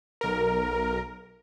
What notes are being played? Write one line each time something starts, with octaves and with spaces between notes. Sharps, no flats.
B1 A#4